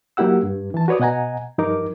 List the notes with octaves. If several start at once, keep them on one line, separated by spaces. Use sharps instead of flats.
F#3 A#3 E4 G4 F#5 E6
G2
E3 A5
F#4 B4 C#5 D5 D#6
B2 D#5 F#5 G#5 A#5
G2 F3 D#4 A#4 D6